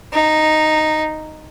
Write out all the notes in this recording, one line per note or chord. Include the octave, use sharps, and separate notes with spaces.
D#4